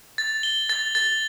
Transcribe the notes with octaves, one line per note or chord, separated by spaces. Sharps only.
A6
G7
A6
A6